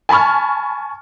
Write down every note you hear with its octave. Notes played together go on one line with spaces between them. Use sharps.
G#5 A5 B5 C#6 F6